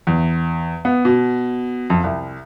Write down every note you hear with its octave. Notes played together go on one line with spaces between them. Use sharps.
E2
B3
B2
F2
C2